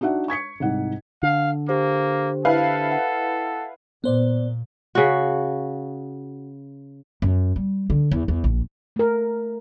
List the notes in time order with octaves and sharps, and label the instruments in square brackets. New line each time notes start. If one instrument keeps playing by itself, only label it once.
[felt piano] D4 D#4 F#4 E5 F#5
C#6 G#6 B6 C#7
C2 G#2 F#5
[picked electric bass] D3 [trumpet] F5
[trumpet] A#3 [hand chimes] G4 C5
[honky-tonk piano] E4 B4 F5 [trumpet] A4
[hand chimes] F#5
[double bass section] A#2 [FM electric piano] B3 C5 D5
[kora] C#3 F#4
[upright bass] F#2
G3
D3
E2
E2
A#1
[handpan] A3 A#4